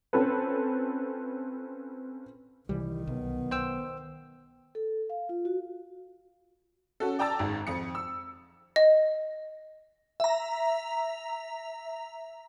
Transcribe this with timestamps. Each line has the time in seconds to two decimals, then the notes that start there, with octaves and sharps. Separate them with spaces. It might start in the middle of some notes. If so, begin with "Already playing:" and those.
0.13 C4 C#4 F4 A4 B4
2.69 C2 D#3 E3 G3
3.07 B1 B3
3.51 C5 G5 E6
4.75 A4
5.10 F5
5.29 F4
5.45 F#4
7.00 C#4 F#4 A4
7.19 D5 G5 A5 A#5 E6 A6
7.39 G#1 G#2
7.67 F2 C#7
7.95 E6
8.76 D#5
10.20 E5 A#5